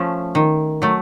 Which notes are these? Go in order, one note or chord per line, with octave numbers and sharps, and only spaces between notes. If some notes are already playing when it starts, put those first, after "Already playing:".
Already playing: F3 A3 C#4
D#3
F#3 A3